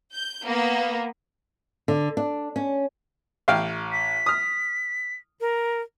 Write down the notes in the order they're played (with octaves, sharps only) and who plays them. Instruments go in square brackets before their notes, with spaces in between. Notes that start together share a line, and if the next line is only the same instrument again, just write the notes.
[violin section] G6
A#3 B3
[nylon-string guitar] D3
D4
C#4
[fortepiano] A1 F5 G5
[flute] B6
[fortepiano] D#6 F6
[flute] A#4